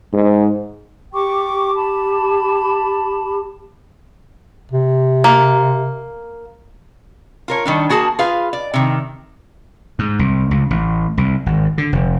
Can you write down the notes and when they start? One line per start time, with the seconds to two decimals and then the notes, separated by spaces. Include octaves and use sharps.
0.13 G#2
1.13 G4 G5 C#6 D6
1.75 A5 B5
4.72 C3
5.24 A#3
7.48 F4 A#4 C#5
7.65 D#3 G3 D4
7.89 A#3 F#4 G#4 A5
8.19 F4 G#4 B4 F5
8.53 D5
8.74 C3 D#3
9.99 G#2
10.19 C2
10.51 C#2
10.71 A1
11.18 C2
11.46 G#1
11.78 D3
11.92 F1